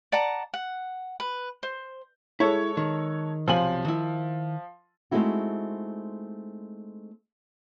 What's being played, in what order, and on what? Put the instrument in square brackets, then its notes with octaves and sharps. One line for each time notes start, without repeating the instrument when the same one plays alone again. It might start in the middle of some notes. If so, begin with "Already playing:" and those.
[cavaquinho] D5 F#5 A5 A#5
F#5
B4
C5
[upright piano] G#3 A4 C#5 [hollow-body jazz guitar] E4
[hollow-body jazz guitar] D#3
[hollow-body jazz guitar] B1 C3 G#5 [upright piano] F3 F#7
[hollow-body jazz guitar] D#3 E4
[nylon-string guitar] G#3 A3 C4 D#4 E4 F#4